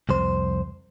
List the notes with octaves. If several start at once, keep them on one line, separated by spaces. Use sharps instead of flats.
C2 F2 C5